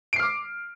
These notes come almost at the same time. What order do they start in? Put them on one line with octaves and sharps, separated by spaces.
D7 C7 F6 D6